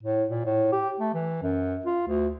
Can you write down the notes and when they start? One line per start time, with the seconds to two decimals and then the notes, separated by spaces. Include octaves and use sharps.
0.03 A2
0.29 A#2
0.46 A2
0.72 G4
1.00 A3
1.14 E3
1.43 F#2
1.86 F4
2.08 D2